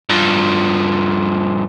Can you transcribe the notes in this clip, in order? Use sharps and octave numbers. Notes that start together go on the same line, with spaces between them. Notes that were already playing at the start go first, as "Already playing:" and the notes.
G2 F3